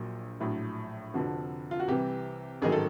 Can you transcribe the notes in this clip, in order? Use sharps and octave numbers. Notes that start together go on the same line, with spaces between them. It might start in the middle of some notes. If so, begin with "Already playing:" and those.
Already playing: A#1 A#2 F#3
A#1 A2 F#3
F1 F2 D3 F3 F#4
F4
F#4
C2 C3 E3 G3 G4
A1 G#2 D#3 F#3 G#4
A4